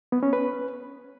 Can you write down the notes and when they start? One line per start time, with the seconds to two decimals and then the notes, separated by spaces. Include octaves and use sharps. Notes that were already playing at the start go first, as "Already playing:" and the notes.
0.12 B3
0.23 C#4
0.33 B4